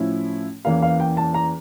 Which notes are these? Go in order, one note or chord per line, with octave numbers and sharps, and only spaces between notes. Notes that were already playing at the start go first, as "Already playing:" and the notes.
Already playing: A2 F3 C#4 E4
E2 E3 A#3 C#4 F5
F5
G5
A5
A#5